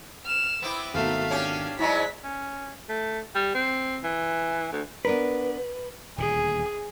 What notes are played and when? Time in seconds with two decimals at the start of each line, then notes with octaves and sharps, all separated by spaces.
0.25 F6 E7
0.62 B3 C4 E4 D6
0.94 G#1 B2 A3 D#4 F#4 F5
1.31 C#4 D4 G4
1.79 G#2 F#3 G#3 E4 D5 B6
2.24 C#4
2.89 A3
3.35 G3
3.55 C4
4.04 E3
4.72 D2
5.05 B3 D4 A#4 B4
6.18 D#1 D2 A#2 G#4